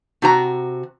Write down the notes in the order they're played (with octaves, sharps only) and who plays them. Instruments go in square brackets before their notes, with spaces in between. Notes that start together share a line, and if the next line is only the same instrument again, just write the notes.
[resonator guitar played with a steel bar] C3 F#4 A#5